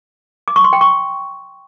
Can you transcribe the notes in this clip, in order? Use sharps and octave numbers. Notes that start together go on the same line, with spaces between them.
D6
C#6
C6
G5
C#6